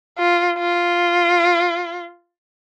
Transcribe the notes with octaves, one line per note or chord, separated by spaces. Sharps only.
F4
F4